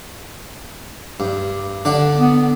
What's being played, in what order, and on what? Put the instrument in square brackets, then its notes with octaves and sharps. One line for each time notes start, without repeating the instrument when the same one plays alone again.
[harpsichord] G2
D3 D4 F#5
[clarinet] B3